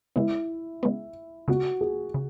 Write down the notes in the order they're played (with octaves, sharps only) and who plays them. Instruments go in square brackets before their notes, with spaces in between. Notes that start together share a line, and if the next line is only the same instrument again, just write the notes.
[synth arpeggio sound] C#3 G#3 B3 [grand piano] E4
[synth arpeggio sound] C#3 G#3 B3
[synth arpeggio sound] C#3 G#3 B3 [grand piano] F#4
[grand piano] G#4
[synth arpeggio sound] C#3